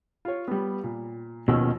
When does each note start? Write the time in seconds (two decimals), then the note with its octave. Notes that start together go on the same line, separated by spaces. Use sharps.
0.25 F4 C#5
0.48 G3 B3
0.84 A#2
1.48 D#2 B2 D#3 F3 C#4 E6